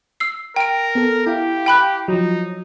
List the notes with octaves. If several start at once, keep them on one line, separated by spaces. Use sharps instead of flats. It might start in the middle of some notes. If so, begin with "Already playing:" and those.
E6 C7
A#4 G5 D7
B3 A4
E4 G4 F5
G5 B5 F#6
F3 F#3 D#4